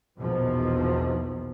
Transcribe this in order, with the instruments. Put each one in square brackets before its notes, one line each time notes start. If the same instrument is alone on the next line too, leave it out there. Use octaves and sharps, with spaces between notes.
[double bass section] A#1 E2 B2 D#3 F3